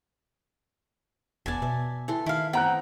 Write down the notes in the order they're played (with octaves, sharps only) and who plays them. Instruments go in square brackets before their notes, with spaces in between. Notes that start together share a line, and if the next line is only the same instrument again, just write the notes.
[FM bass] E1 [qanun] B3 A5 [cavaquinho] D5 G#5
[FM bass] B2 [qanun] E5
[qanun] E3 A4 C6
[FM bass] D#3 [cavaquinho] E4 F5
[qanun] B3 C4 [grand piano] F#5 A#5 F#6 [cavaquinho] G5